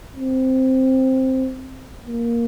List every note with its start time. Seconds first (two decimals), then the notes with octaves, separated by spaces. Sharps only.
0.16 C4
2.06 A#3